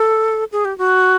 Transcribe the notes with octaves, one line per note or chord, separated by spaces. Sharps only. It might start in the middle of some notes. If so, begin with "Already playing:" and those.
Already playing: A4
G#4
G4
F#4